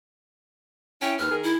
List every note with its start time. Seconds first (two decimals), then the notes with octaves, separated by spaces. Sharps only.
1.01 C#4 E4 G5
1.18 D#2 B4 F6
1.31 D#3 G#4 A#4
1.44 E4